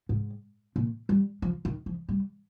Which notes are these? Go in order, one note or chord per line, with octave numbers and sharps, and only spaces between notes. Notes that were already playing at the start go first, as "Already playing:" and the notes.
G#2
A#2
G3
F3
D#3
F3
G3